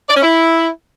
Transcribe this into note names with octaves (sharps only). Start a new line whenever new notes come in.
D5
C#4
E4